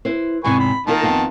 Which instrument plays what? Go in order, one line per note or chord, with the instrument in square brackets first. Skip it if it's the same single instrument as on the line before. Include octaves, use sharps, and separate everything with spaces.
[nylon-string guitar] E4 B4 C5
[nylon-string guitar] E2 G#2 C3 [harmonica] B4 G#5 C#6
[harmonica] B5
[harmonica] D#3 A5 [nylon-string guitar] A#3 F4 A#4
[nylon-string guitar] F2 B3 F4